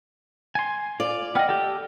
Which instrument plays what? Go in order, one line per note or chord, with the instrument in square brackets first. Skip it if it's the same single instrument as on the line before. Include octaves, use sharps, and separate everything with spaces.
[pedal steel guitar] G#5 C6
[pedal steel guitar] F4 [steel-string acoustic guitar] D5
[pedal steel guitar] B3 D#5 [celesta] F#5 G5 F6
[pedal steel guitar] G4 A4